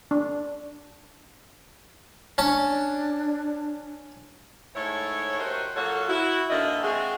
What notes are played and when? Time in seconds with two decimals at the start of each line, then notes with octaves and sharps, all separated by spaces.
0.11 D4
2.38 C#4 D4 A5
4.75 G#2 A3 E4 C#5
5.39 F#4 G4 A#4 C5 C#5 D#5
5.76 F#3 A#3 F4 F#4 A4 C#5
6.08 E4 F#4
6.50 G#2 D3 D#3 A#3 D#5 E5
6.83 G#3 C4 F#4 G#4